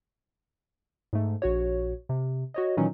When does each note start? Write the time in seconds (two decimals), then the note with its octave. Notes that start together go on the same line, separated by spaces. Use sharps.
1.13 G#2 A3
1.42 A#1 F#4 C#5
2.09 C3
2.54 F#4 C#5 D#5
2.77 A#2 D#3 E3 F#3 C#4 D#4